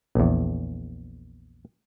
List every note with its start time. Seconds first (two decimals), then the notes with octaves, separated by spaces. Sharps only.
0.15 A#1 E2